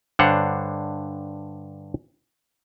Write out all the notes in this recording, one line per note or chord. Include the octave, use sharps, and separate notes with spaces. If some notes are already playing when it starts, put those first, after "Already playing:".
G2 D3 D4 C5 C#5 F#5